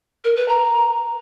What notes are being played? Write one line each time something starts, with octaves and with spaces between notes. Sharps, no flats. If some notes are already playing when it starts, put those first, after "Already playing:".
A#4
B4
A#5